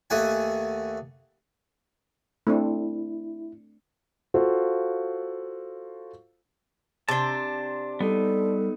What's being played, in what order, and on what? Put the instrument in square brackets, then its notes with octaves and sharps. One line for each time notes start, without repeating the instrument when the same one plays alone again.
[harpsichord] D#2 A3 F#5 G#5
[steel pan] A3 C4 D4 [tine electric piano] E4
[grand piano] F4 F#4 A4 C5 F5
[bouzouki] C3 D4 [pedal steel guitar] A5 C6
[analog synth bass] G3 [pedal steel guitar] B3 D#4 [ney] A4